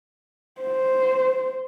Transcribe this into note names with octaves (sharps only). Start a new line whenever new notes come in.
C5